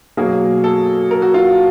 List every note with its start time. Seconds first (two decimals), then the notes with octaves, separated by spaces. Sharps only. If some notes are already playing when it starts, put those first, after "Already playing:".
0.17 B2 F#3 A#3 G#4
0.64 A4
1.11 A#4
1.22 F#4
1.34 F4